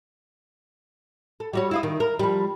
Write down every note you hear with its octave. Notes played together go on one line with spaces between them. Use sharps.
A4
G3 F#4 C#5
E4 F4 D#5
D#3
A#4
F3 G3